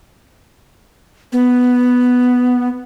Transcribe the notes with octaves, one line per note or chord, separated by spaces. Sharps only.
B3